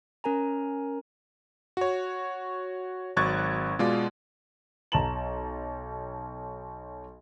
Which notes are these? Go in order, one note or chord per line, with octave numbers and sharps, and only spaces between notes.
C#4 A#4 G#5 A#5
F#4 C#5
G#1 F#3 C#6 F#6 G#6 A6
B2 G#3 F4 D5
B1 A5 A#5 E7 F#7